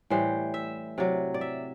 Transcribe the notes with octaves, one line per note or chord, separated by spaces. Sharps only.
A2 E3 G3 C5
E5
C3 F#3 D5
D5
E5